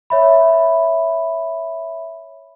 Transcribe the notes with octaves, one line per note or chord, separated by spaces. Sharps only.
C#5 E5 B5